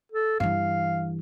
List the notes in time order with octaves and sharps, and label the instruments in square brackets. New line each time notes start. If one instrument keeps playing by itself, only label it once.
[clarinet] A4
[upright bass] G2 E3 [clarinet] F5